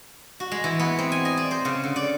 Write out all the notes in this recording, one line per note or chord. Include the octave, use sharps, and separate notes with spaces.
F#4
G#3
E3
B3
C4
G#5
D#5
D5
C5
C#3
D3
D5